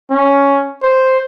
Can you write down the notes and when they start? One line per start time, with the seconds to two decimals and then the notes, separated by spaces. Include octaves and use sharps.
0.10 C#4
0.83 C5